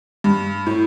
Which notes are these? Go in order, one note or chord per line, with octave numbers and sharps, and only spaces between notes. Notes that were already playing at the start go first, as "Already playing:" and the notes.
G2
A2